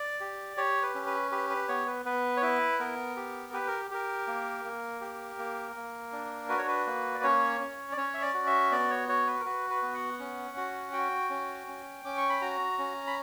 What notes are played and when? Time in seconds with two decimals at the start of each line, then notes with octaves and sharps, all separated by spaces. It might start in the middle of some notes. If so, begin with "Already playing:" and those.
Already playing: D5
0.20 G4
0.57 G4 C#5
0.82 B4
0.95 C#4
1.06 B4
1.31 G4 B4
1.50 B4
1.68 B3 C#5
1.87 B4
2.05 B3 B4
2.37 C#5
2.42 E4 B4
2.79 B3 A#4
3.16 G4
3.53 G4 B4
3.67 A#4
3.91 G4 A#4
4.27 A#3
4.65 A#3
5.01 G4
5.39 A#3
5.76 A#3
6.12 D4
6.49 F#4 B4
6.58 C#5
6.68 B4
6.87 A#3
7.15 D5
7.24 C#4 C#5
7.60 C#4
7.92 D5
7.97 C#4 C#5
8.14 E5
8.22 D5
8.34 F#4
8.47 E5
8.71 B3 D5
8.91 C#5
9.09 F#4 C#5
9.27 B4
9.41 A#4
9.45 F#4 B4
9.70 B4
9.82 B3
9.94 F#5
10.19 C#4
10.57 F#4
10.93 F#4 G5
11.30 C#4
11.67 C#4
12.05 C#4 D6
12.17 C#6
12.29 B5
12.42 F#4 A#5
12.78 C#4
13.07 B5